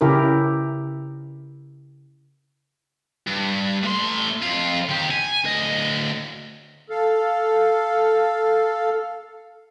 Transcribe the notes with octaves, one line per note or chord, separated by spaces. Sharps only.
C#3 E4 G4 A#4
G2
A2 C6
F2 F4
D#3 G4
G#5
D2 D#5
A4 F5